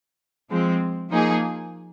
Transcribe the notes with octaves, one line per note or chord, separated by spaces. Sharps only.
F3 G#3 C4
F3 A#3 D#4 G#4